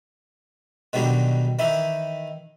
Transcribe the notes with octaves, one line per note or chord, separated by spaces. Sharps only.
B2 D3 D#3 F#3 G3 G4
D#3 E3 D#4 E4